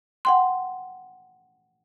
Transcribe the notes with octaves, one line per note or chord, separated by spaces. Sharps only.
F#5 G5 C6